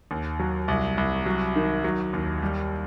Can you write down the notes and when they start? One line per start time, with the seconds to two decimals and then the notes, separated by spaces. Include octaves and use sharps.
0.11 D#2
0.40 F#3
0.68 C2
0.97 C2
1.26 F#3
1.56 D#3
1.84 F#3
2.13 D#2
2.42 G3